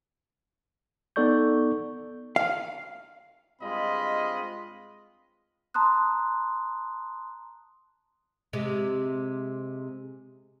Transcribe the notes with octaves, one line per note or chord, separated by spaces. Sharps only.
B3 D#4 A4 D5 C#6 G6
F5
G2 G#3 C4 F4 D#5 B5
A5 A#5 C6 D#6 F#6
C3 G#3